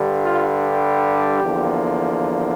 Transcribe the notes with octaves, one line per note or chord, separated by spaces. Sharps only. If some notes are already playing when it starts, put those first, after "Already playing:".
Already playing: G2 D3 G3
F4
G4
E2 D3 F3 A#3